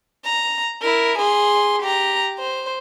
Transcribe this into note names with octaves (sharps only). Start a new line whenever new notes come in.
A#5
E4 A#4
G#4 C6
G4 A#5
C5